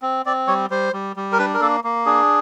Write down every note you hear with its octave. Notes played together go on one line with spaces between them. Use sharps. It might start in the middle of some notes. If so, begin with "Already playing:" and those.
C4
C4 D5
G3 C#5
G3 C5
G3
G3
A#4
D4 B4
A#4
A#3 A4
A#3
D4 G#4